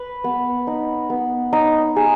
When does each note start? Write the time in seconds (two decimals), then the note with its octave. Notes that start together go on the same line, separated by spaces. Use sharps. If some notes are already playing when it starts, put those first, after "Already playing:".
Already playing: B4
0.24 B3
0.67 D#4
1.10 B3
1.53 D#4
1.96 G#4